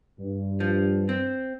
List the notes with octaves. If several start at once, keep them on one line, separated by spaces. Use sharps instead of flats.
G2
F3
C4